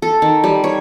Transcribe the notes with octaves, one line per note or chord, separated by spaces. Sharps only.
A4
D#3
G3
C#5